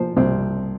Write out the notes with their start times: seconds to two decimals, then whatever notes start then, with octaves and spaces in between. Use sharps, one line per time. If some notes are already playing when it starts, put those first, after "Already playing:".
Already playing: A#2 F3 C5
0.17 C2 C4